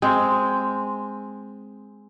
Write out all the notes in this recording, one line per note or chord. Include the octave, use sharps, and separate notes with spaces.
G#3 C4